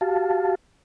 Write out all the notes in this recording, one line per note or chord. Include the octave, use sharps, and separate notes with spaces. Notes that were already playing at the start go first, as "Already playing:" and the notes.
F#4 G4 F5 A5